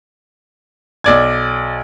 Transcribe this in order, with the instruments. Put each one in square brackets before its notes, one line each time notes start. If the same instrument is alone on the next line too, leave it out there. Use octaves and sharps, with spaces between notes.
[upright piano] B1 D5 G#6